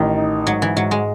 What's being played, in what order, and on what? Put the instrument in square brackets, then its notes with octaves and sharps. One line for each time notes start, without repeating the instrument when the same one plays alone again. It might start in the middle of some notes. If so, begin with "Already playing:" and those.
Already playing: [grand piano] A1 [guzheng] D#3
[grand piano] D#4
[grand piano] G#2 [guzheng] F#3
[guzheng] E3
[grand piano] G#2 [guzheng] F#3
[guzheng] G#3